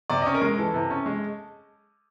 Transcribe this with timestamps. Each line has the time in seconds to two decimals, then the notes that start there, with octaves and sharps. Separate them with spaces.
0.10 C3 D5
0.22 C#4 D#5
0.34 A#4
0.42 G#3
0.58 E3 A4
0.74 C3
0.90 C#4
1.06 G#3